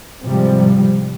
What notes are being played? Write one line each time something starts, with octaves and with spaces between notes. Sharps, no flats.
G#2 C3 F3 G3